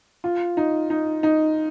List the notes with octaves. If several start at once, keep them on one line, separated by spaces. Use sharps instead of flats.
F4
D#4
D#4
D#4